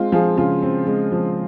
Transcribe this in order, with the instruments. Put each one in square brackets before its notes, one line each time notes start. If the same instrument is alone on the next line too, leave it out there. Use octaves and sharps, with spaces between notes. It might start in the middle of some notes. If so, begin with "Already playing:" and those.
Already playing: [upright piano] G#3 C4 F4
F3 F4 G#4
C#3 F4 G#4
C4
G#3
F3